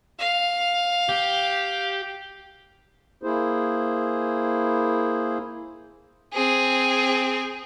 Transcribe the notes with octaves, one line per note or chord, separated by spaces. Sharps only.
F5
G4
A#3 E4 G#4 C5
C4 G#4